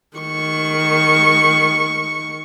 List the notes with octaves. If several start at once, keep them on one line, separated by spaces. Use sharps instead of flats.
D#3 C#6